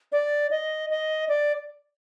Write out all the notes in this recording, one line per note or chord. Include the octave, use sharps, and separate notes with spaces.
D5
D#5
D#5
D5